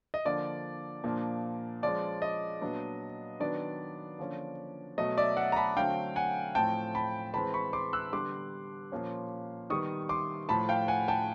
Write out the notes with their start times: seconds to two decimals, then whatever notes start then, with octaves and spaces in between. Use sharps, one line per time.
0.14 D#5
0.25 D3 F3 A#3 D5
1.04 A#2 F3 A#3 D4
1.83 F3 G#3 C#4 D5
2.22 D#5
2.61 A#2 F#3 B3 D4
3.40 D#3 F#3 B3 D4 D5
4.19 D3 F3 A#3 C#4
4.98 B2 F#3 A3 D#5
5.17 D5 E5
5.37 E5 F#5
5.52 A#5
5.56 A5 B5
5.77 D3 F#3 A3 C4 F5 G5
6.16 F#5 G#5
6.55 A2 F3 A3 C4 G5 A5
6.95 A5 B5
7.34 E3 G#3 C4 A5 B5
7.54 B5 C#6
7.73 C6 D6
7.93 E6 F#6
8.12 D3 G3 B3 C6 D6
8.92 A#2 F3 A#3 C#4
9.70 D#3 G3 B3 C#6 D#6
10.09 C6 D6
10.49 A2 F3 A3 A5 B5
10.69 F5 G5
10.88 F#5 G#5
11.08 G5 A5